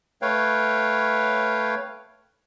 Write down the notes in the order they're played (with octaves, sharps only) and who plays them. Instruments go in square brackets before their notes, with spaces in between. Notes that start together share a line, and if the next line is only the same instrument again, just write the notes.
[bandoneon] A3 B4 C#5 F5 G5